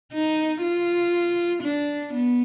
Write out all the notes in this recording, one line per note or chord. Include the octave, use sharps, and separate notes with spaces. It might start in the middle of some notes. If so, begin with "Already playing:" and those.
D#4
F4
D4
B3